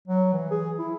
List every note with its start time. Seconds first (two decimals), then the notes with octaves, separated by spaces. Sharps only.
0.08 F#3
0.33 E3
0.51 G#4
0.79 E4